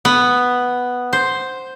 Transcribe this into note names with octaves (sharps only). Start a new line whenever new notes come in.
B3
C5